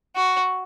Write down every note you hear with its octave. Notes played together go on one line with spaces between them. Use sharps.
F#4